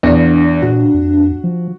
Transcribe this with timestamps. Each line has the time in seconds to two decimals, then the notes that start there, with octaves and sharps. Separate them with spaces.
0.03 E2 D4
0.62 A#2 F#4
0.94 F2
1.44 F3